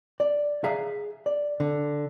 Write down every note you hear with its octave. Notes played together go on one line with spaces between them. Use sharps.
D5
G#4 E5 F5 A#5
D5
D3